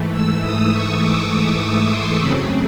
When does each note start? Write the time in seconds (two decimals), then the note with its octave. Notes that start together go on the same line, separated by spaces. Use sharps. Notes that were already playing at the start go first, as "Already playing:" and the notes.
Already playing: G#2 E3 A3
0.12 E6
0.42 D#6
0.72 C#6
1.01 D6
1.30 C#6
1.59 C#6
1.89 C6
2.18 F#2 C#3 F#3 A3 C4 B5